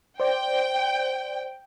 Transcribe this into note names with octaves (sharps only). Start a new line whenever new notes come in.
C5 D5 G5